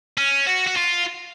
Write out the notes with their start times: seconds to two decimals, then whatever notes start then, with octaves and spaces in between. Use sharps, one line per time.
0.18 C#4
0.47 F#4
0.67 F#4
0.76 F4